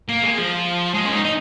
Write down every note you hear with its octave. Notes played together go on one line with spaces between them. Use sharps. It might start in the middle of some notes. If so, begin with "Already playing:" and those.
A#3
G#3
F3
G#3
C#4
D#4
D#4